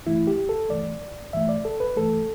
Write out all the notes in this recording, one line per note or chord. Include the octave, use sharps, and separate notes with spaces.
G2 E3 A3 E4
G4
A4
G2 E3 A3 D5
G2 E3 A3 E5
D5
A4
B4
G2 E3 A3 A4